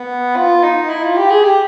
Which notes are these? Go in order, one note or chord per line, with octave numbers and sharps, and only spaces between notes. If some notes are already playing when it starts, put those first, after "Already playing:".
Already playing: B3
F4
D#4
E4
F4
G4
G#4
G4